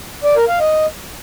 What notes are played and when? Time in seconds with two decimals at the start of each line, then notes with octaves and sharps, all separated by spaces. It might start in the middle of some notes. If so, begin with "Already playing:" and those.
0.24 D5
0.36 A#4
0.48 F5
0.60 D#5